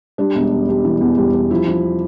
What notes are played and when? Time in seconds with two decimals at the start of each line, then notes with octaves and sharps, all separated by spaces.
0.18 G3 D4
0.35 E1
0.51 G3
0.69 G3
0.85 E3
1.01 E2
1.18 G3
1.34 G3
1.51 F3 E4
1.67 F3